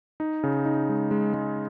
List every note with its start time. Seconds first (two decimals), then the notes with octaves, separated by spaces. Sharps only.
0.20 D#4
0.43 C#3
0.65 D#4
0.89 G#3
1.11 G#3
1.34 G#3